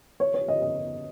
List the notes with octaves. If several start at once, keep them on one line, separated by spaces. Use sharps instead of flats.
C#5
C#5
D#5
D#5